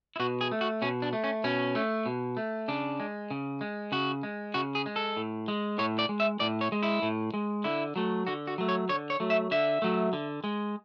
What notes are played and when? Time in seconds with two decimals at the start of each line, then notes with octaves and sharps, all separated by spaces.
0.16 E4
0.20 B2 F#4
0.41 G#4
0.52 A3
0.61 F#4
0.82 B2 C#4
1.02 D4
1.13 A3
1.24 C#4
1.44 B2 C#4
1.75 A3
2.06 B2
2.37 A3
2.68 C#3 D4
3.00 G#3
3.31 C#3
3.61 G#3
3.92 C#3 F#4
4.23 G#3
4.54 C#3 F#4
4.75 G#4
4.86 G#3
4.96 A4
5.17 A2
5.48 G#3
5.78 A2 C#5
5.99 D5
6.09 G#3
6.20 E5
6.40 A2 D5
6.61 C#5
6.72 G#3
6.83 E4
7.02 A2
7.34 G#3
7.64 D3 E4
7.96 F#3 A3
8.27 D3 F#4
8.47 F#4
8.58 F#3 A3
8.69 C#5
8.89 D3 C#5
9.10 C#5
9.20 F#3 A3
9.30 E5
9.51 D3 E5
9.82 F#3 A3
10.13 D3
10.44 G#3